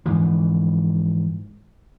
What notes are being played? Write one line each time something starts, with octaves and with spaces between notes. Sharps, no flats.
G#2 E3 F3